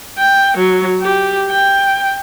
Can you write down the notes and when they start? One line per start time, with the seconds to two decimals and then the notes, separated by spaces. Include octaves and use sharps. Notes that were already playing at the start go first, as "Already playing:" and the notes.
0.19 G5
0.57 F#3
1.02 G4
1.50 G5